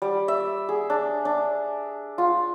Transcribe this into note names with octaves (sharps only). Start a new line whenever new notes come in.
G3
E5
G#4
D4
D4
F4